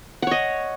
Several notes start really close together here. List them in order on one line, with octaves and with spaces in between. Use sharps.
F#5 C#5 D#5